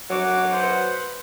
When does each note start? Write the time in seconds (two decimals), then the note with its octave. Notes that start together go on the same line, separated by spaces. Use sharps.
0.10 F#3 F#4 D6
0.52 B4 C5 F#5